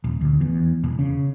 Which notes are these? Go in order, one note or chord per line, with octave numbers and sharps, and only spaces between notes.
D#1
D2
E2
E1
C#3